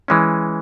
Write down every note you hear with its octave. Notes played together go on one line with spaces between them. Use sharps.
E3 G#3 C#4